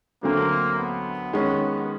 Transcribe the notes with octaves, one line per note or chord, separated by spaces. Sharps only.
D2 D3 F#3 A3 A#3 C4
B3
D#3 G#3 C#4